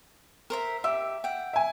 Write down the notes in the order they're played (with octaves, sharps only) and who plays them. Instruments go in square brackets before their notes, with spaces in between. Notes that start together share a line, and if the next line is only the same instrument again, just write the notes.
[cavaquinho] A#4 C5 E5
[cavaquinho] G4 [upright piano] E5 E6
[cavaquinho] F#5 G5
[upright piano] E5 G#5